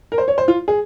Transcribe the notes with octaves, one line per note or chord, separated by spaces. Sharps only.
A#4
C5
C#5
C5
F4
G#4